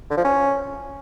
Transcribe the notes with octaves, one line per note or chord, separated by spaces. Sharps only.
D3
F3
C#4